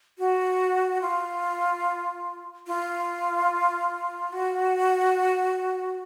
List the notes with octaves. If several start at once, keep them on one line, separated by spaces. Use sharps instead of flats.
F#4
F4
F4
F#4